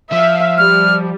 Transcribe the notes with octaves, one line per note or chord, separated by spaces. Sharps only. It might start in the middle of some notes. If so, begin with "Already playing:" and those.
F3 E5 F5
G3 F6